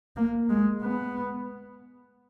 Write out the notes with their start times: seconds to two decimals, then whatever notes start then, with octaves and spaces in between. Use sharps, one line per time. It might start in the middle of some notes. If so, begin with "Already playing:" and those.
0.16 A#3
0.49 G#3
0.82 B3